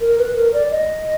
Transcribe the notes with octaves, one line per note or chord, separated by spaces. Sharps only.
A#4
B4
A#4
D5
D#5